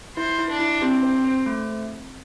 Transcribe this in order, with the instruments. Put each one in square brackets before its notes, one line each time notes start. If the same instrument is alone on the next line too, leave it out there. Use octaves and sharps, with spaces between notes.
[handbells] E4 [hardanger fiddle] C5
[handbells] E4
[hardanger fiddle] D4
[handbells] E4
[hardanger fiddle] C4 [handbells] G4
[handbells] C5
C5
A3